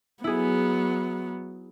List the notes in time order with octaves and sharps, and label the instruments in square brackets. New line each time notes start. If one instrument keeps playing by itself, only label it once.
[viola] F#3 B3 [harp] E4 G#4